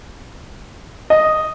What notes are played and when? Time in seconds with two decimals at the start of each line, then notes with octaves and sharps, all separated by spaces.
1.10 D#5